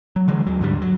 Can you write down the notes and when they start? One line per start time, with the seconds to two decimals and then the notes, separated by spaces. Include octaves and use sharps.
0.16 F#3
0.28 D3 E3 G#3
0.47 D#2 F#3
0.61 G#2 D3 G3
0.82 F#3